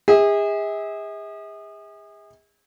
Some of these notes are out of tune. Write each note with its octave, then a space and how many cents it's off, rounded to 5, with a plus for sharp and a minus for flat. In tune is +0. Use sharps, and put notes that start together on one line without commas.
G#4 -35 E5 -45